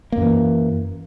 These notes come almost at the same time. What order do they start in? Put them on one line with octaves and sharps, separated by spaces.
A#3 F#2 E3